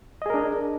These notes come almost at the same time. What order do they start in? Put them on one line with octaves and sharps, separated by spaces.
D#5 G#4 A#4 D4